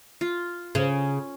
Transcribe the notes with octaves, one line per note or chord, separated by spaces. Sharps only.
F4
C#3 C#4